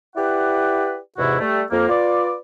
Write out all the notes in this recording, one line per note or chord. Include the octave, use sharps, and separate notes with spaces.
E4 G4 B4 D5 F#5
E2 G#2 C3 E4 F#4
G3 A3
F2 A#3
F4 B4 D5